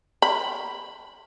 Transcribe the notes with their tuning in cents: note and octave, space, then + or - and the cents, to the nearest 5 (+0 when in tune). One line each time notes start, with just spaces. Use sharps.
B5 -5